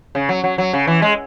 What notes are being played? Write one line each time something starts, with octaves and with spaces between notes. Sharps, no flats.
C#3
F#3
F#3
F#3
C#3
E3
G#3